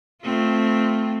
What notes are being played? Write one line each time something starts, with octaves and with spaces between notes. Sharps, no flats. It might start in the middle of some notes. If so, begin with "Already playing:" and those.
A3 C4 F4